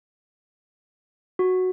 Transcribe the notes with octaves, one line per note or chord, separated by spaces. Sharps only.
F#4